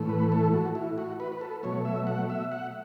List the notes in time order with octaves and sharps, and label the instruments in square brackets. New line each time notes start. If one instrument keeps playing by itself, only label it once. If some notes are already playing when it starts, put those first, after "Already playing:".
Already playing: [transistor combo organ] A2 E3 A3
B4
A4
F#4
E4
F#4
B4
B4
A4
B2 F#3 A3 C#5
E5
F#5
E5
F#5